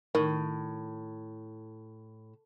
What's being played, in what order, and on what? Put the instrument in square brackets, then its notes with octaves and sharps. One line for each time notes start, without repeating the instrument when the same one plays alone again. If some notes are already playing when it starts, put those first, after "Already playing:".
[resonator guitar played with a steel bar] A2 [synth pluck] D#3